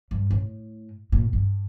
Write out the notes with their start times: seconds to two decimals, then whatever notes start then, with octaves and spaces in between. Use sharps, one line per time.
0.11 G2
0.31 A2
1.12 A#2
1.33 G2